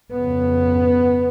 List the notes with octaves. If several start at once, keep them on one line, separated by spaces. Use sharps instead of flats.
F2 C#3 B3